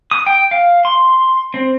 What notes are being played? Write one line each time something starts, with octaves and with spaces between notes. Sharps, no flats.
D#6
G5
F5
C6
C4